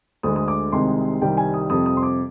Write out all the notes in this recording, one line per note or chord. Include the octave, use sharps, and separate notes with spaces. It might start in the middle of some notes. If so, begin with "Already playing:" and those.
D2 D3 G#3 D#6
D#6
D6
C2 C3 D#3 G#3 C6
C2 C3 D#3 G3 G5
G#5
D#6
F2 C3 G3 D#6
D#6
C6
D6